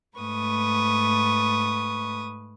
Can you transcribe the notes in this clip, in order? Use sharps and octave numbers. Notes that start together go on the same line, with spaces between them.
G#2 A3 B4 C#6 D#6